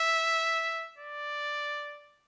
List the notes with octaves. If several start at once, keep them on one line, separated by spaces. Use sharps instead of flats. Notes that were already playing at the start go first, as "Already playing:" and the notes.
Already playing: E5
D5